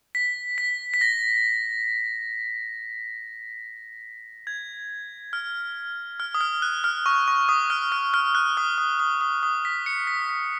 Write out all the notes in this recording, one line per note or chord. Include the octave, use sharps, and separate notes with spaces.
B6
B6
B6
A#6
G#6
F6
F6
D#6
F6
F#6
F6
C#6
C#6
D#6
F6
F6
F6
F#6
D#6
D#6
D#6
D#6
D#6
B6
C#7
B6
B6